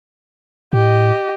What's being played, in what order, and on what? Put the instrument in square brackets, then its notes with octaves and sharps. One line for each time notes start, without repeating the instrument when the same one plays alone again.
[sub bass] A2 [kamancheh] G4 D#5